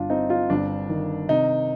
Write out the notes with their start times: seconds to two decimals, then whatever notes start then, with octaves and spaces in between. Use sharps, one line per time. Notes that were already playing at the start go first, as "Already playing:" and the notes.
Already playing: G1 D4 F4
0.10 C4 D#4
0.30 F4
0.50 G1 D4
0.89 D#3
1.29 C3 D#4